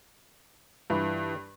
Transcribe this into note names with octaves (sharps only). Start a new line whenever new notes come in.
G2 E3 E4 F4